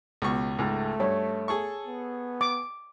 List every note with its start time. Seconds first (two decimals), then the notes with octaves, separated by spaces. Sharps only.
0.22 C#2 B2 C#6
0.58 C#2 G#2 A3
1.00 G2 C#5
1.48 G#4 A4 C#6
1.87 B3
2.41 D6